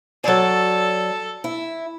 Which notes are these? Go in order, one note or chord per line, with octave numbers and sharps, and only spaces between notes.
F#3 A4 D5
E4